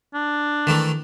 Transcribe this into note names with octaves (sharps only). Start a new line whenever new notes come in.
D4
D#3 E3 A3